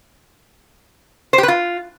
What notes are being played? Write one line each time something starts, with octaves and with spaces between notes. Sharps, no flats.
C5
G4
B4
F4